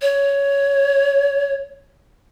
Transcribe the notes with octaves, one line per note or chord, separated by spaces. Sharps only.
C#5